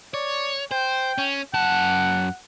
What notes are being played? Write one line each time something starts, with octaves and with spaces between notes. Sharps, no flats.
C#5 D5
C5 G5
C#4
F#2 F#5 A5